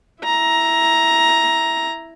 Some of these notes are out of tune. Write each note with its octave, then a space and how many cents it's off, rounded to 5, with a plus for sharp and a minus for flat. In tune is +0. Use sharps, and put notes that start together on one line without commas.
E4 +0 A#5 +10